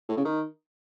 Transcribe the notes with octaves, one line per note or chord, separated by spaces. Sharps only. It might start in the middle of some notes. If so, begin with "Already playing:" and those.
A2
C#3
D#3